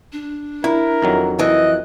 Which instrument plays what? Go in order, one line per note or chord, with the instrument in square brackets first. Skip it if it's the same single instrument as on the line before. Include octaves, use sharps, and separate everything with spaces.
[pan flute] D4
[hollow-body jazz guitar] E4 [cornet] A#4
[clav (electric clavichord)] F2 D#3 F#3
[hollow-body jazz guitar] E3 [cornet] D#5 [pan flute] F#6